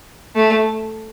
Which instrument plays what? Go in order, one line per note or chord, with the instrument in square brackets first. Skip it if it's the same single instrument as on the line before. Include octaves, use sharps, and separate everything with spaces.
[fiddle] A3